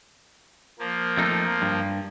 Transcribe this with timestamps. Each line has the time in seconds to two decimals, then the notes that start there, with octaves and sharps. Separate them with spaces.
0.79 F3 A#3
1.17 F2 A3 D#4
1.62 G2